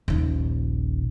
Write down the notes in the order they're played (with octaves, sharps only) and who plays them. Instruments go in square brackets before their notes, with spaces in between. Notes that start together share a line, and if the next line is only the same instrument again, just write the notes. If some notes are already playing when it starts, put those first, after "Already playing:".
[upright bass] D#1 A#1